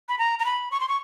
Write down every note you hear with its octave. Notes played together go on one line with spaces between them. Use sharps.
B5
A#5
A#5
B5
C#6
C6
C#6